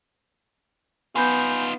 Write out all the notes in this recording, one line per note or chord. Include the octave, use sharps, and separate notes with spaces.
B3 D#4 F4 G#5 B5 G6